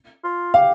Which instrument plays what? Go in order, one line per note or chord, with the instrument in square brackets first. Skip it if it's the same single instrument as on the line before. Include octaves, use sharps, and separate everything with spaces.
[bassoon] F4
[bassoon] G4 [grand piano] F5